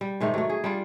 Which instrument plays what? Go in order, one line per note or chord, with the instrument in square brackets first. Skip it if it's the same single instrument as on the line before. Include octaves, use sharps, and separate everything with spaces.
[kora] G3
G#2 C3 D#3 A3
F#3 A3
G#4
G3 D4 F4